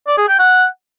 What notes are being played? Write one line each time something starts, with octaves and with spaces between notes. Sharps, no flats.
D5
G#4
G5
F#5